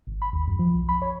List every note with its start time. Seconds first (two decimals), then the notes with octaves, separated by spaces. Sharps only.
0.07 G#1
0.22 B5
0.33 D#2
0.48 F#2
0.59 F3
0.74 B1
0.89 B5
1.02 C#5